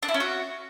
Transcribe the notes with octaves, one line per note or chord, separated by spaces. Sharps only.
D4
E4
C#4
F#4